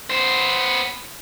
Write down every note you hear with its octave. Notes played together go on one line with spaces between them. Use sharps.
B3 C5